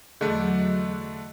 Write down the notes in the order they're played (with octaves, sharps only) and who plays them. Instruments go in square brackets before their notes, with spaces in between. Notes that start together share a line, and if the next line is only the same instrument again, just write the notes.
[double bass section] E2 F#3 [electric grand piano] D3 A3 D4 [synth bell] G#4 D#5 F#6